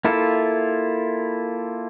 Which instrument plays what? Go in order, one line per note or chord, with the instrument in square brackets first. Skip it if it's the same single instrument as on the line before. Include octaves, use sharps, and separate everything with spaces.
[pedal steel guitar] A#3 E4 F4 A4